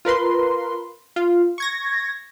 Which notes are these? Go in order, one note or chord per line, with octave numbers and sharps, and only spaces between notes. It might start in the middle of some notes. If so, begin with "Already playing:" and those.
F4 A#4 B4 C6
F4
C#6 G#6 A#6